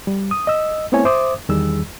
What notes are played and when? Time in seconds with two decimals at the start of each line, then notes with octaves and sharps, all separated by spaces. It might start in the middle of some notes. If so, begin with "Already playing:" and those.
0.07 G3
0.31 D#6
0.47 D#5 E6
0.92 A3 B3 C4 E4 C#5 G#5
1.05 C5 E5 D6 D#6
1.49 E2 D#3 G3 G#4 E6